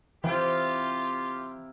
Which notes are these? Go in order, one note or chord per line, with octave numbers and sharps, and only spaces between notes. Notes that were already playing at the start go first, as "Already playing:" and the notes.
C3 E3 E4 F4 G4 A#4